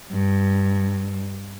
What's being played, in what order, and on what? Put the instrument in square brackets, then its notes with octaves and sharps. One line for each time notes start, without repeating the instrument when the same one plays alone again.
[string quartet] G2